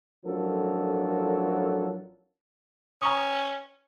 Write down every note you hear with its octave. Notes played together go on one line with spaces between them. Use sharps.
A1 F3 F#3 D4 A4 A#4
C#4 A#5 C#6 D#6